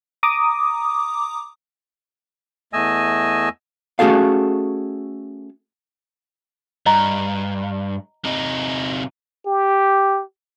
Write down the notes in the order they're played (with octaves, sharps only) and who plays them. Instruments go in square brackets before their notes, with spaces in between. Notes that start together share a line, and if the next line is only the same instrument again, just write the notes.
[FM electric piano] A#5 D6 D#6
[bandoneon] E2 A3 D#5 G#5 E6
[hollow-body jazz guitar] A3 C#4 F#4 G#4 A4 F5
[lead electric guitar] G2 [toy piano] D#5 A#5
[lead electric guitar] C3 D#4
[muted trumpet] G4